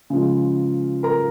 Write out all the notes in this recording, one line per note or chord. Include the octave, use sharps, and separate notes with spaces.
C#3 F3 G#3
A#4 A#5